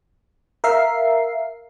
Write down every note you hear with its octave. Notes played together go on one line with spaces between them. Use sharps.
A#4 E5 F5 C7